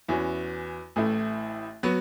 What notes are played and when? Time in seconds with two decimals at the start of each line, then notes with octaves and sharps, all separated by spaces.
0.09 E2 E3 C#4 F#4
0.96 A1 A2 A3 E4
1.83 F#3 B3 F#4